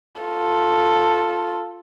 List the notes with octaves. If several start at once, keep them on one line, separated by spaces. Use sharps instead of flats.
F4 A4